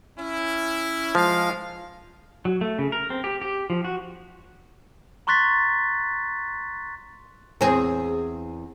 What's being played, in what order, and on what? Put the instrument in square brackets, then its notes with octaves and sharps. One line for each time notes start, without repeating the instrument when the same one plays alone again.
[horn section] C#4 E4
[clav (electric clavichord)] F3 [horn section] G#3 F5
[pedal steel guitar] F#3
A3
C#3
A#4
C4
G4
G4
F3
F#4
[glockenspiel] A#5 C6 C#6 F#6 A6 B6
[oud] E2 C4 G#4